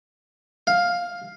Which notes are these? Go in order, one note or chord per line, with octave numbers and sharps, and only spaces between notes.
F5